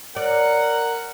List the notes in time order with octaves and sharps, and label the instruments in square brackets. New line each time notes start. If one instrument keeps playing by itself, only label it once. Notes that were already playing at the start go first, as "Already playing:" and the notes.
[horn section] A#4 F#5 [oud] D5